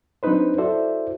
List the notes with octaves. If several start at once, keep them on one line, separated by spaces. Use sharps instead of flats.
F#3 C4 D4 D#4 B4 C5
E4 F#4 A4 C5 D5 E5